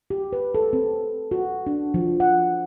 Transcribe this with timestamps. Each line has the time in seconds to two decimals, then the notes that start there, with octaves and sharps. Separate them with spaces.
0.10 G4
0.33 B4
0.55 A4
0.73 C4
1.31 F#4
1.67 D4
1.94 F3
2.20 F#5